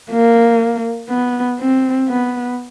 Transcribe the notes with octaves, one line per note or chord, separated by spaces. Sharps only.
A#3
B3
C4
B3